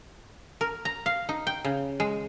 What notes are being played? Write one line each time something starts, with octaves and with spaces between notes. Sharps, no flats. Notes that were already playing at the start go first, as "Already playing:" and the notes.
A#4
A#5
F5
D#4
G5
C#3
G#3